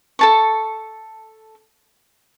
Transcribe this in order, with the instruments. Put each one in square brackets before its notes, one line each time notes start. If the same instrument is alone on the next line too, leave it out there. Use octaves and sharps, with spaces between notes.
[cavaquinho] A4 A5 C#6